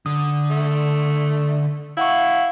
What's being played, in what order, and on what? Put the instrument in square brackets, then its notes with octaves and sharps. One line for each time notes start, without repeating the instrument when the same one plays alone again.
[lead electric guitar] D3 [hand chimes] D#6
[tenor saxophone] A3
[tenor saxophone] E4 [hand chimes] F5 F#5 C#6